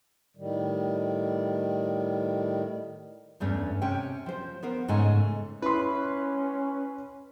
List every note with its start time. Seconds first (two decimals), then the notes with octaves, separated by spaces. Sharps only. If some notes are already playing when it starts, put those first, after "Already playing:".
0.37 A2 D#3 G3
3.40 E2 G2 A3 C#4
3.82 C3 C#4 G5
4.26 F3 C5
4.63 B3 A#4 C5
4.88 G#2 C#3 A3 C#4 G#5
5.62 C#4 E4 B4 C6